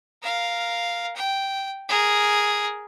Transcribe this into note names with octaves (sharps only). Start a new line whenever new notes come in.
A#4 F5
G5
G#4 A#4